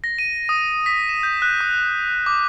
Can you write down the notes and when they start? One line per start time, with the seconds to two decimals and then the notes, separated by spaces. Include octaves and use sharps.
0.04 A#6
0.19 D#7
0.49 D#6
0.86 B6
1.09 E7
1.23 G6
1.42 F#6
1.61 D#6
2.26 D6